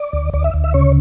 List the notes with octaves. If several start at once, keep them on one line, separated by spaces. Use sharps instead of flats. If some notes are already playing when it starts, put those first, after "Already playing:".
Already playing: D5
D2
D2 D5
E5
D2
E5
C#3 C#5